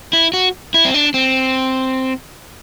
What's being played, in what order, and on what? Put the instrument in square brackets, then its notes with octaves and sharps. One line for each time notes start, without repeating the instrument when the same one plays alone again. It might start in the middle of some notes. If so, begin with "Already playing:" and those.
[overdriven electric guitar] E4
F#4
E4
C4
D4
C4